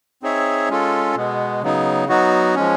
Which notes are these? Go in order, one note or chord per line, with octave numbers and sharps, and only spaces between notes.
C4 D#4 G#4 C#5 E5
G#3 C#4 F4 A4
B2 G#3 B3
C#3 F#3 B3 D#4
F#3 B3 D#4 F#4
F3 G#3 C#4